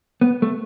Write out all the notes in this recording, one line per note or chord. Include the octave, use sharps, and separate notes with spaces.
B3
A3